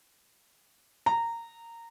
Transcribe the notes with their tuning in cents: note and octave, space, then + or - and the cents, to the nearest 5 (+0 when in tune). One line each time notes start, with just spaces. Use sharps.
A#5 -15